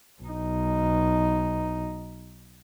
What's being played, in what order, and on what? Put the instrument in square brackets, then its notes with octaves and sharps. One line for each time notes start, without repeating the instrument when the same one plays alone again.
[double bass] B1 D#4